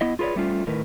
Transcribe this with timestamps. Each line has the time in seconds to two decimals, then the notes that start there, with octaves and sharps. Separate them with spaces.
0.01 B3 E4 D#5
0.19 F4 G#4 B4 C#5 D5
0.36 G3 A3 C#4 F4 C5
0.67 A2 D#3 A#4 B4